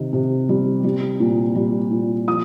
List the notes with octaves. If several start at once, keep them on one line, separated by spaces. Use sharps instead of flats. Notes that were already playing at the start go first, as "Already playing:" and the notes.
Already playing: C3 D#3
C3
G3
G3
A#2
G3
A#2
F3 D#6